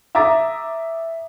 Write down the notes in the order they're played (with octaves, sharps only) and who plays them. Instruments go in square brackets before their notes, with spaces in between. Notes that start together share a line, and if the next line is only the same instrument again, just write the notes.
[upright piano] E5 A#5 D6 D#6 A6